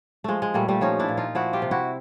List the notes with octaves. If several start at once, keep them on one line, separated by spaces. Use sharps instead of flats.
F3 G#3 A3
G#3
A#2 G3 A3
G3 A3
F3 C#4 D#4
D4 E4
A#2
D#4 F4
F3 E4 F#4
F4 G4
C3
E4 F#4